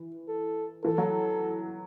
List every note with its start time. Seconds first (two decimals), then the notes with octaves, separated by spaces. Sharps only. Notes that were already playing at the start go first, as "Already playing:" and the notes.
Already playing: E3
0.29 A4
0.84 E3 A4
0.98 F#3